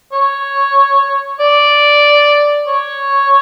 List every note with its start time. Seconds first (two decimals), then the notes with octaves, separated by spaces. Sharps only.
0.12 C#5
1.40 D5
2.67 C#5